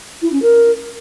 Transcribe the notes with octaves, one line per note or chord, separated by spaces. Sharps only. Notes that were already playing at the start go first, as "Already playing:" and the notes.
E4
C#4
A#4